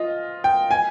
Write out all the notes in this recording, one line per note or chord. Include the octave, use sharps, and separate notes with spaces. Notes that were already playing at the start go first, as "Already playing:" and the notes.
Already playing: F4 D#5
G5
G#5